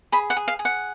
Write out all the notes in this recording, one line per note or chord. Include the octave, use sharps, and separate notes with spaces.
G#4 B5
F#5
G#4
F5
G#4
F#5